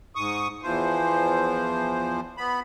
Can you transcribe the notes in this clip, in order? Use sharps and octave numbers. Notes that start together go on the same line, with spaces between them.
G#2 C#6 D#6
E2 E3 F3 C5
B3 B5